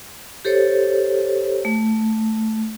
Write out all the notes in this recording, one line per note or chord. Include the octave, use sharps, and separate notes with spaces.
G4 A4 C5 C#5
A3